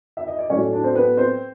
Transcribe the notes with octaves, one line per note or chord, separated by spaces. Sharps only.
E5
D#5
D5
A2 F#3 A3 C#4 C#5
D4 D5
C4 C5
B3 B4
C4 C5